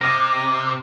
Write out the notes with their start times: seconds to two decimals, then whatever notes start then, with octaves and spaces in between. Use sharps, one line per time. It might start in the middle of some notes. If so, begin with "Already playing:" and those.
0.01 C3 A#4 D#5 D6